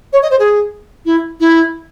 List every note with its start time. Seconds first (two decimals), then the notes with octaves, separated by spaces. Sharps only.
0.13 C#5
0.22 D#5
0.31 C5
0.39 G#4
1.06 E4
1.40 E4